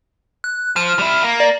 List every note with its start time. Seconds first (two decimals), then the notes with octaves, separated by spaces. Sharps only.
0.44 F#6
0.76 F3 F6
0.99 G3 E4
1.23 A#3
1.40 D5